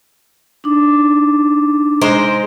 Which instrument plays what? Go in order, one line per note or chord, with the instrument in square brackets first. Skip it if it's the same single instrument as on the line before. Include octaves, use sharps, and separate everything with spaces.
[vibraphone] D4 D#4 D6
[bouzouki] G#3 A#4 C5